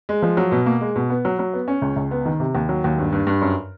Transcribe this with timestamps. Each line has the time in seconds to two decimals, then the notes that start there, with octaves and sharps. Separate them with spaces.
0.09 G#3
0.22 F3
0.37 F#3
0.52 B2
0.66 A#3
0.81 G#3
0.96 B2
1.10 B3
1.25 F#3
1.39 F#3
1.54 B3
1.68 C#4
1.82 C#2
1.96 C#2
2.11 B3
2.26 D#3
2.40 C3
2.55 D#2
2.69 F#3
2.84 D#2
2.98 G2
3.13 G2
3.27 G2
3.42 F#2